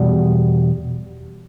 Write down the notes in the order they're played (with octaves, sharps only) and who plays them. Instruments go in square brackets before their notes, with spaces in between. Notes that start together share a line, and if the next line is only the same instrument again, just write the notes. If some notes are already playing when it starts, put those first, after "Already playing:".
Already playing: [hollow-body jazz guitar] E2 B2 G3